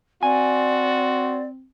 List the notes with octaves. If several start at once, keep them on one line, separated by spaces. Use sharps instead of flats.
C4 F#4 D5 G#5